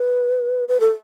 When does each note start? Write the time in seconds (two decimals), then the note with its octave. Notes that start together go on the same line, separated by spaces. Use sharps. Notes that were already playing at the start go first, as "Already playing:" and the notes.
Already playing: B4
0.68 B4
0.80 A4